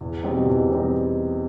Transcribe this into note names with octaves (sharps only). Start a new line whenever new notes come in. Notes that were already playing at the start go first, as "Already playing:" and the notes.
E2
B2 G3 C4 D#4
E2
B2 G3 C4 D#4